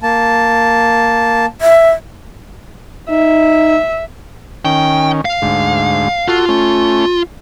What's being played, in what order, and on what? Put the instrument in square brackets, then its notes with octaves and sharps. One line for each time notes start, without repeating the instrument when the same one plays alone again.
[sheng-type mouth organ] A#3 A5
[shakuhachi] E5
[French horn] D#4 [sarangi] E5
[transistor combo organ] D#3 C#4 [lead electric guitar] G5
[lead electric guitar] F5
[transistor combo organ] D2 G#2
[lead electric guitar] F4 [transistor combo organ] F#4 A4
[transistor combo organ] A3 C#4